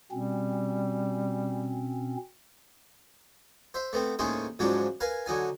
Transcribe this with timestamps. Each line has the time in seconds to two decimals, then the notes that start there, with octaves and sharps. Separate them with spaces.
0.11 B2 G3 C4 C#4
3.74 C5 E5
3.93 A3 B3 C4
4.19 D#2 A2 D#3 G#3 C#4 C5
4.59 G#2 F3 F#3 G#3 C#4 D4
5.00 A#4 B4 F5 G#5
5.26 D3 F#3 D#4 G#5